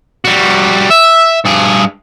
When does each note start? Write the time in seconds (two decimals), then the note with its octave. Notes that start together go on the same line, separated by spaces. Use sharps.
0.25 G3 F#4
0.91 E5
1.45 G2 G#4